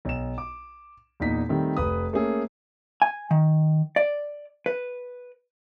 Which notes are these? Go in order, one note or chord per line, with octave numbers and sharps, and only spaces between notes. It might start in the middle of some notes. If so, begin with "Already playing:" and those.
B1 E7
D6
E2 A#2 D#4 B6
D#3 G3 A3 C4
F1 B4 D#6
A3 A#3 C#4 G#4 A4
G#5
D#3
D5
B4